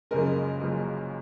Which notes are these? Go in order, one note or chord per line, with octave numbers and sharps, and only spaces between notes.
F#1 F#2 C#3 F3 G#3 A#4
F#1 F#2 C#3 F3 G#3